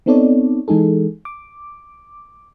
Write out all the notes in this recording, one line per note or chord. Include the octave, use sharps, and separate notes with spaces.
B3 C4 D#4 A4 C#5 D5
E3 G#3 D#4 G#4 A4
D6